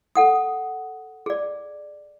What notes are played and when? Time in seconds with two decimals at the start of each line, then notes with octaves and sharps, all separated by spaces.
0.15 A4 F#5 D#6
1.26 G#4 D5